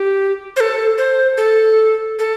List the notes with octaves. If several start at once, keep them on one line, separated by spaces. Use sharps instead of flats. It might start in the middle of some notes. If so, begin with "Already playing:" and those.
Already playing: G4
C5
A4
C5
A4
A4